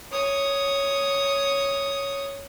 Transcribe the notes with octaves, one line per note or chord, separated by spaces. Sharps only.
C#5 D#6